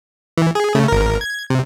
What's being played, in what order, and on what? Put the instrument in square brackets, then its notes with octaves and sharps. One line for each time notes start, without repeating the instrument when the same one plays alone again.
[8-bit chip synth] E3
G#4
C#3 A3
G#1 A#4
G#6
C3